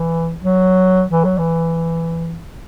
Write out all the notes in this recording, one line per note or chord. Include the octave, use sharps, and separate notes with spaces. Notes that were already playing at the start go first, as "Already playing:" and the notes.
Already playing: E3
F#3
E3
F#3
E3